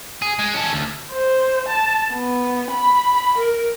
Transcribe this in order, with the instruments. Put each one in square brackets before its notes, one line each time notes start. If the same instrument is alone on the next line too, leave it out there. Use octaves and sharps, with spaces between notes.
[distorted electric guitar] G#4
G#3
C#4 A4
D2
[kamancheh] C5
A5
B3
B5
A#4